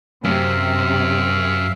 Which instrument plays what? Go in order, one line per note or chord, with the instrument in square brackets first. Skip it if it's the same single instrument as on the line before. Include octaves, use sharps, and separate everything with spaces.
[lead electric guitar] F#2 [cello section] C3 [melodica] E5 F5